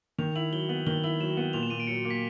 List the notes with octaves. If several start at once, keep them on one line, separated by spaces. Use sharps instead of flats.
D#3 F7
E4 F#7
F#3 G7
B3 F#7
D#3 G7
E4 F#7
F#3 E7
B3
A#2 F7
E7
A#2 D#7
D7
F#3 C#7
A#3
B6